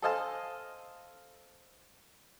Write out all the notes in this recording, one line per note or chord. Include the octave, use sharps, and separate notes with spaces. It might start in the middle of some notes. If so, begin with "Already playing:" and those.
A4 C5 D#5 F5 G#5 A5